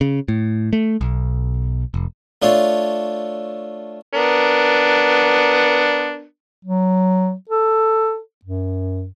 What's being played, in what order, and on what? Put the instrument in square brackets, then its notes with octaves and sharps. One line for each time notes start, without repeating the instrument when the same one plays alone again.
[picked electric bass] C#3
A2
A3
B1
F1
[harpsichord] A3 D4 F4 C#5 F5
[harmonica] B3 D4 A#4
[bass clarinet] F#3
A4
F#2